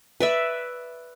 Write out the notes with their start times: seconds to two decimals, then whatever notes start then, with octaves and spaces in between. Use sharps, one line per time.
0.20 B4 D5 E5